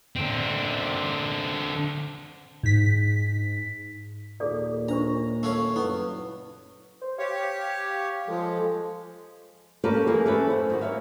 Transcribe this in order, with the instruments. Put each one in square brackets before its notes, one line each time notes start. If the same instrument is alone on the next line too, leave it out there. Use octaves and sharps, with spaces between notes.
[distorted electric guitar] D3 C4
[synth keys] G#2 B6
[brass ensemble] D#2 A#2 [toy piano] G#4 A4 D5
[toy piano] D4 C5 C#6 [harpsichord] A#5
[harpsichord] A3 C#4 F5
[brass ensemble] F#1 [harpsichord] B3 [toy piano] E4
[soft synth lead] C5
[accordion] G4 C#5 [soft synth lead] F5
[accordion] F3 G#3 [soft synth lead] A4
[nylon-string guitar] A#3 C#4 G4 A4 B4
E3 A#3 G#4
A3 C#4 B4
F#2 C5
D#3 F4 F#4
A#3 C#5 E5 F5